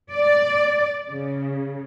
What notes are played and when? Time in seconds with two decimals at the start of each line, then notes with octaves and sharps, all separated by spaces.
0.13 D5
1.10 C#3